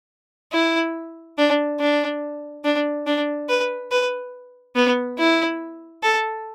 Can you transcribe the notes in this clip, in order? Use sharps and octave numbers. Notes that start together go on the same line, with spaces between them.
E4
D4
D4
D4
D4
B4
B4
B3
E4
A4